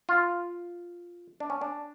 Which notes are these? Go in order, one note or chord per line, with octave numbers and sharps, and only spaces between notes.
F4
D4
C#4
D4